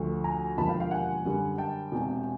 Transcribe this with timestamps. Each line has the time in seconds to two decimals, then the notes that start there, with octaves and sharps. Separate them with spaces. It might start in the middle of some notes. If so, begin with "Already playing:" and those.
Already playing: D2 D3 F3 A3
0.24 G#5 A#5
0.57 E1 D#2 D3 F3 A5 B5
0.69 F5 G5
0.80 F5 G5
0.91 F#5 G#5
1.25 F#2 D3 G3
1.58 G5 A5
1.92 E1 E2 C3